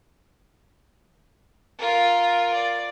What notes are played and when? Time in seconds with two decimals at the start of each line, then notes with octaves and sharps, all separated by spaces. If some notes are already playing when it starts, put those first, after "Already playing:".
1.79 F4 A#4
2.54 D5